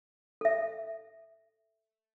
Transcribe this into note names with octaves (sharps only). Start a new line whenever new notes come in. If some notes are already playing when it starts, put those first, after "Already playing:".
A4 E5